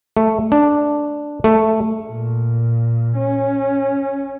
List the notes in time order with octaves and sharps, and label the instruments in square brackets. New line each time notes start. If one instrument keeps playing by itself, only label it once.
[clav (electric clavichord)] A3
D4
A3
[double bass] A#2
C#4